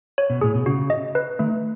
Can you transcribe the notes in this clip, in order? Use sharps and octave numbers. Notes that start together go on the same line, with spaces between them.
C#5
B2
A2 G#4
B2
C#3 F#4
D#5
B4
D#3 A3